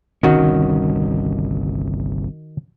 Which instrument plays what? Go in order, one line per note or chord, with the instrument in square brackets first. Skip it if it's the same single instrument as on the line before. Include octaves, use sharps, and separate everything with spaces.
[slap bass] G1 C2 C#4 [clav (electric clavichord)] D#3 F#4